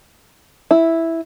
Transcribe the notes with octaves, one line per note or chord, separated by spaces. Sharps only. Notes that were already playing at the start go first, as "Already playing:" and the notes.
E4